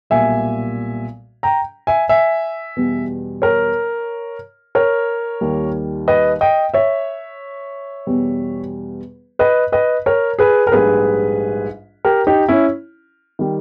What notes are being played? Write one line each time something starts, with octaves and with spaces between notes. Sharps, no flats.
B1 A#2 G3 E5 G#5
G5 A#5
E5 G#5
E5 G#5
E2 B2 G3
A#4 C#5
A#4 C#5
D#2 D#3 G3
B4 D#5
D#5 G5
C#5 E5
E2 B2 G3
B4 D#5
B4 D#5
A#4 C#5
G#4 B4
A#4
A#1 G#2 G3 G#4 B4
G4 A#4
D#4 G4
C#4 E4
D#3 G3